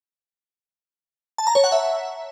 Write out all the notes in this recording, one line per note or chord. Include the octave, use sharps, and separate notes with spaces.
A5
A#5
C#5
F#5
E5